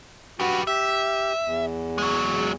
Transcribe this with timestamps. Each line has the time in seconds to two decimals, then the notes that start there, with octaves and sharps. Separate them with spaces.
0.40 F#4 G4 B4
0.67 G4 E5
1.44 E2
1.98 F#3 G#3